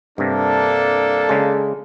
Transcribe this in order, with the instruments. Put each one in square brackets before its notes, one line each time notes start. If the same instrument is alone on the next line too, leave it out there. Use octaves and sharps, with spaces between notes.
[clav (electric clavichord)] G2 C3 [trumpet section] A#3 D4 A4
[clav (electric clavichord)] C#3 G#3